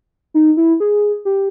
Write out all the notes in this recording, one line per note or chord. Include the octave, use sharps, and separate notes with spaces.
D#4
E4
G#4
G4